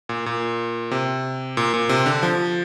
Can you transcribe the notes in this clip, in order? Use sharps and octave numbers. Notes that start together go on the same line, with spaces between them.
A#2
A#2
C3
A#2
A#2
C3
D3
F3